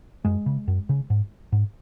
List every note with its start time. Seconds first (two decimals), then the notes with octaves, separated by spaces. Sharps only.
0.25 F#2 G#3
0.46 C#3
0.68 F#2
0.89 C#3
1.10 G#2
1.52 G#2